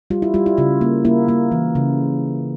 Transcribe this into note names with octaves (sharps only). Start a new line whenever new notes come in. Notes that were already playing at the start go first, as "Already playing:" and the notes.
G3 F4
E4
G3 F4
E4
C#3 F4
A#3
A#3 E4
A#3
E3
C#3